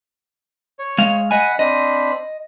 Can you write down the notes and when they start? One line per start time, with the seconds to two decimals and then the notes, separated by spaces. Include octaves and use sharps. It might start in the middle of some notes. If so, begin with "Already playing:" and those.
0.79 C#5
0.98 G#3 F5
1.31 D#5 F#5 G#5 B5
1.59 C4 D4 D#5 B5